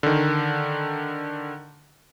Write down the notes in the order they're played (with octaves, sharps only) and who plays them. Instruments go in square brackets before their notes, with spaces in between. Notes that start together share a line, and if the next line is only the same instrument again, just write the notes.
[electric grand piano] D3 D#3